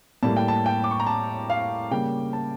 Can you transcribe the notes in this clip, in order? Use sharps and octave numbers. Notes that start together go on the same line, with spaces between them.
A2 G3 A#3 A5
G5
A5
G5
D6
C#6
A#5
A5
F5
C#3 G3 A#3 G5
A5